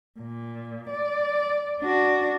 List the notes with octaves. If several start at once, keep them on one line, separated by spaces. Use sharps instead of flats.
A#2
D5
D4 F#4